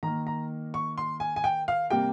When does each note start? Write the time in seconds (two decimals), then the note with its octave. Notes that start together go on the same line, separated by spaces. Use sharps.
0.03 D#3 A#3 A#5
0.27 A#5
0.74 C#6
0.98 C6
1.20 G#5
1.36 G#5
1.44 G5
1.68 F5
1.90 C3 G3 A#3 G5